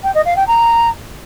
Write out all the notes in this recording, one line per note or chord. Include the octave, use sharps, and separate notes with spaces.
G5
D#5
F5
G5
A#5